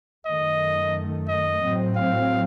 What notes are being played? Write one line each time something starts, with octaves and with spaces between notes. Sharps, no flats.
F#2 D#3 A3 D#5
D#5
A2 F#3 C4
F5